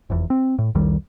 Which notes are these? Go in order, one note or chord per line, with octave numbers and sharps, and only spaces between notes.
F1 E2
C4
A2
C2 F2 D#3 G3